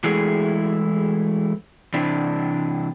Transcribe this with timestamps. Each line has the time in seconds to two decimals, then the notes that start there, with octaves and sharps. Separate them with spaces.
0.04 E3 G#3 A3 E4 G#4
1.94 C3 E3 D4